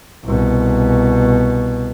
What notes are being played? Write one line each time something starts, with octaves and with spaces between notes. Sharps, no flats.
C2 B2